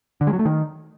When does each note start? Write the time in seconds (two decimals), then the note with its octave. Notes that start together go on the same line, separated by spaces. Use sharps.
0.21 D3
0.27 G#3
0.33 F#3
0.39 A3
0.45 D#3